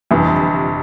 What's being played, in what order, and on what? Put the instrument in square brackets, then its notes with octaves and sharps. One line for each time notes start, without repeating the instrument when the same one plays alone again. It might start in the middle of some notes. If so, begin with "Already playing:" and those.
[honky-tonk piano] G1 F2 C3 E3